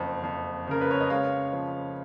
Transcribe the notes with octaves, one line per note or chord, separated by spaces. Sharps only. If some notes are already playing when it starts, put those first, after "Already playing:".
Already playing: F#1 F2
F2
C#3 A#4
B4
C#5
D#5
G#3 C#5 F5
F3